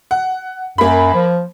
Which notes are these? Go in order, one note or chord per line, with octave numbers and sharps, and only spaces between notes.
F#5
F#2 A#3 B5
F3